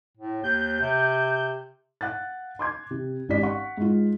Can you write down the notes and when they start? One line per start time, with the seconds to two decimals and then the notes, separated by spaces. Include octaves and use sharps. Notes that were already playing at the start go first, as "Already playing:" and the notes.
0.18 A2
0.44 D#2 G6
0.81 C3
2.01 F5 F#5 F#6 A6
2.59 C6 D6 G#6
2.91 C3
3.29 G#1 C#4 D#4 G4 D5 B6
3.43 F5 F#5 C#6
3.77 G#2 F4